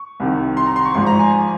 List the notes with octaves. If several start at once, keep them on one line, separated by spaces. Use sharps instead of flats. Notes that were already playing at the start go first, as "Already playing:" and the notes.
Already playing: C#6
C2 C3 D#3
C6
A#5
C6
C#6
G#1 G#2 F3 C6
A#5
G#5